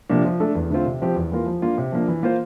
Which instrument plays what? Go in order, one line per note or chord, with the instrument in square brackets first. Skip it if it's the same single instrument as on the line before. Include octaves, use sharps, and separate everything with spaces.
[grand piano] C3 F3 A#3 D4
F3
A3 D4 A4
E2
D3 A3 C4 F4
C3
F3 C4 G4
E2
E3 A#3 F4 A#4
F3
A#3 D4 F4
C3
F3 A#3 D4
E3
A#3 F4 C5